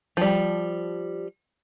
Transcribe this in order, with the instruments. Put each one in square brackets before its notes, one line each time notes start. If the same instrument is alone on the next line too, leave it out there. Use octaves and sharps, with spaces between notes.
[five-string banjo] F3 G3